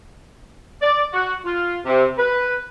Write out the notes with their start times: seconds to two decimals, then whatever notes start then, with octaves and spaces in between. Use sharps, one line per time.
0.82 D5
1.13 F#4
1.45 F4
1.85 C3
2.18 B4